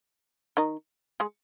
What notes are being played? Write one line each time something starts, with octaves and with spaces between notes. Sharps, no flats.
D#3 D#4
G#3 G#4